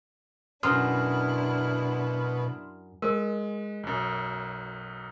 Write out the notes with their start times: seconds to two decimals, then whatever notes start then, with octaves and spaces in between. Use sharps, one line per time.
0.63 F#2 B2 D4 E4 C6 D#6 F6
3.02 G#3 A#4
3.83 B1 F#2